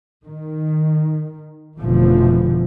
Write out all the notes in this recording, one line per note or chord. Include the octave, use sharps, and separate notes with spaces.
D#3
F1 B2 D3 E3 F3